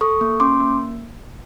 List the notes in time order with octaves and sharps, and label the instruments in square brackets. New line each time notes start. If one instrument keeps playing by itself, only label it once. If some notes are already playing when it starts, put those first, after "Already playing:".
[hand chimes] A4 C#6 D#6
A#3
C#4 C6 D6
A#3